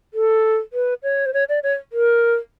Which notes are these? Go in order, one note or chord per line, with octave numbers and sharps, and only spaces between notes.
A4
B4
C#5
C5
C#5
D5
C#5
A#4